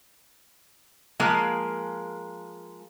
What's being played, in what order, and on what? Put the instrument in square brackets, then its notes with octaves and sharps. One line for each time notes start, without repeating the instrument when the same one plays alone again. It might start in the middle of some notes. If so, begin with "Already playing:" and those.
[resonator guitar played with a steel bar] F3 G#3 A#3